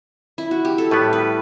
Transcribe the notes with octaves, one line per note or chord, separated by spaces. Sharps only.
E4
F#4
G4
A4
A2 G3 B3 B4
B4